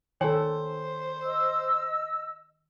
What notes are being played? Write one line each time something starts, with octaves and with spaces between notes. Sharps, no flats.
D#3 A4 C5 C#5 G5 G#5
D#5 E6